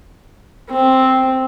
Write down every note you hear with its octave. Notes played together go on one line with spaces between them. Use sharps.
C4